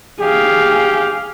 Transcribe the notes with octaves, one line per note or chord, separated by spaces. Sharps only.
G4 G#4 F5